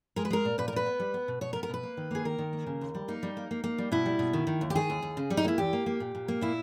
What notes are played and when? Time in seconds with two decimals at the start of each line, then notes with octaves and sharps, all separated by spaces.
0.16 G#3 A#4
0.25 B4
0.30 G#3 A#4
0.45 A#2
0.58 A#2 B4
0.68 A#4
0.73 A#2 B4
0.86 B3
1.00 G3
1.14 B3
1.28 B2
1.41 B2 C#5
1.53 A#4
1.56 B3
1.63 A#4
1.70 B2 B4
1.83 A#3
1.97 D#3
2.11 A#3 G#4
2.25 D#3 A#4
2.38 D#3
2.53 A#3
2.67 C#3
2.81 D#2
2.95 G3
3.08 A#3 D#4
3.23 G3
3.37 A#3
3.51 A#3
3.64 A#3
3.78 G3
3.92 B2 E4
4.06 G3
4.19 B2
4.33 D#3
4.47 D#3
4.61 D#2
4.70 G4
4.75 D#3 G#4
4.90 D#2
5.02 D#2
5.17 C#3
5.30 G3
5.37 D#4
5.45 A#3 E4
5.58 E2 G4
5.73 A#3
5.86 A#3
6.00 A#2
6.15 A#2
6.28 A#3
6.41 A#2 E4